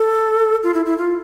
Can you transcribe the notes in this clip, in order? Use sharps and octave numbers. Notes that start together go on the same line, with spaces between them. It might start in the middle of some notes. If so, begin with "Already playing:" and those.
Already playing: A4
F4
E4
E4
F4